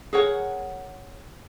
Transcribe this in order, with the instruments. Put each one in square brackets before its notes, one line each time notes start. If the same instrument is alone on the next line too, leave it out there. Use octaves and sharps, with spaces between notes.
[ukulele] G#4 A#4 C#5 F#5